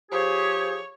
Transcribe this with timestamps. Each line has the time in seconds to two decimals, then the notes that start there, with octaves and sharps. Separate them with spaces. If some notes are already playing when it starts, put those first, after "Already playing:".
0.12 F3 G4 G#4 C#5